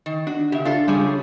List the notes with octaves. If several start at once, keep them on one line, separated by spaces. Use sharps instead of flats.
D#3
D4 F#4
C#3 G4 E5
D4 F4 A4
C#3 G3 C#4 G#4